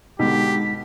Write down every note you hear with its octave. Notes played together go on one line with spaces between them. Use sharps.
B2 D3 G#3 D#4 G4 B6